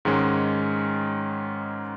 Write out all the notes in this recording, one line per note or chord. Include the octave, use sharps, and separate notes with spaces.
G#2 D#3 G#3 C#4